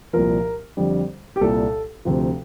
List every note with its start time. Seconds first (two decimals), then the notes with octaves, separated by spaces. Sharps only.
0.13 C2 A#2 F3 A#4
0.77 F2 D3 G3
1.36 G4
1.41 C2 A#2 G3 A4
2.05 D2 C3 F3